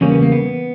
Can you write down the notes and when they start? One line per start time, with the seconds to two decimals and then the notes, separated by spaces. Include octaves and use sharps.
0.01 E2 C#3 G3 A#3 C#4
0.12 B3
0.22 A#3
0.32 B3